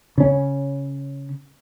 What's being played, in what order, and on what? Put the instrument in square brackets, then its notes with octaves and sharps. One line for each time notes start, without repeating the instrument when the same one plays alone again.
[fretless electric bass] C#3 C#4